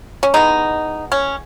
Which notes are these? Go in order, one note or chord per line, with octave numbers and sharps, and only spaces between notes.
C#4
E3 G#3 B3 D#4
C#4